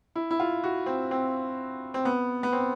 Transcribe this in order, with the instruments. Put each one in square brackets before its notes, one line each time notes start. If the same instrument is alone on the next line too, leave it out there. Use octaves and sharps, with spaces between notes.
[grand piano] E4
E4
F4
F#4
C4
C4
C4
B3
B3
C4